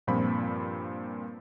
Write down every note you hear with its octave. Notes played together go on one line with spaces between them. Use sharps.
G2 A#2 F3 C4 B5